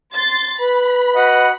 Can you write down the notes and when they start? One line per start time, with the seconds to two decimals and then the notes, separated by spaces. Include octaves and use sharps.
0.13 C6 A6
0.60 B4 B5
1.15 F#4 D#5 F#5